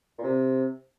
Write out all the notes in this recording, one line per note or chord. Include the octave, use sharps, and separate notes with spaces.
A#2
C3